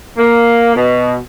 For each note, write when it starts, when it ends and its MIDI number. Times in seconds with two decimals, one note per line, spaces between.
0.18 0.73 58
0.75 1.17 47